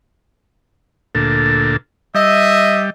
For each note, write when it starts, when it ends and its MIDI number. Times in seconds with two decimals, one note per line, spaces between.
1.15 1.77 38
1.15 1.77 46
1.15 1.77 69
2.14 2.90 55
2.14 2.85 75
2.14 2.85 76